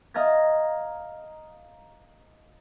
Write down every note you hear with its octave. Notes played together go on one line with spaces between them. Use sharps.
D#5 F5 A#5 G#6 A6